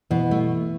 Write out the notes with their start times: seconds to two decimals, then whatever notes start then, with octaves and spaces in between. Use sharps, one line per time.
0.11 B2 E3
0.31 A3